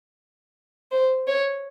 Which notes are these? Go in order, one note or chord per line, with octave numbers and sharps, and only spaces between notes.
C5
C#5